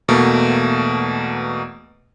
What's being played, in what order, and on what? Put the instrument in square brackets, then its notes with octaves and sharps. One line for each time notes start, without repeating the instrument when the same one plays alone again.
[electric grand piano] E2 B2 A3 A#3